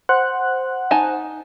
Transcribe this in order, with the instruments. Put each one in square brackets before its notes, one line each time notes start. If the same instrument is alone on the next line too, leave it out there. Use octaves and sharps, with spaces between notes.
[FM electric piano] C5 F#5 F#6
[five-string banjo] D#4 G#5 A5